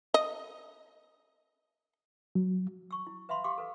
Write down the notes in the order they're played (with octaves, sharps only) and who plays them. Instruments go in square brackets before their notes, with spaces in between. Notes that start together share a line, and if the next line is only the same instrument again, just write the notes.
[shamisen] D#5
[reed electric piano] F#3
[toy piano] C#6 E6
E4
B4 E5 F5 B5 C6
G4 F5 C6 D6
A4 B4 F5